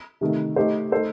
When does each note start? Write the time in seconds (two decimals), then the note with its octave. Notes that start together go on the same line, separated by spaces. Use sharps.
0.21 C3 D#3 A3
0.56 A3 D#4 G4 C5
0.91 A3 D#4 A4 C5